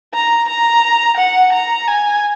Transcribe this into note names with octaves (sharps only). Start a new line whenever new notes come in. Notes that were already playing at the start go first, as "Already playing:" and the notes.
A#5
A#5
F#5
A#5
G#5